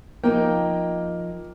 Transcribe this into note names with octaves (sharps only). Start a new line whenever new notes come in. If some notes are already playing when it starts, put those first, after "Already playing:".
F3 A#3 D#4 G5